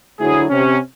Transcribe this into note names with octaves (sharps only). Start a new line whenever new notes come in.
D2 F#3 E4 G#4
C3 C#4